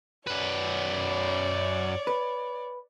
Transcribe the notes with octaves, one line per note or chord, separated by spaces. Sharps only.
F#2 B4 C#5 D5
B4